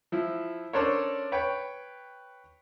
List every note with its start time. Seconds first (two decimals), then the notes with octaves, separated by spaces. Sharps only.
0.12 F3 E4
0.73 C#4 D4 A4 A#4 C5 C#5
1.32 B4 C#5 G5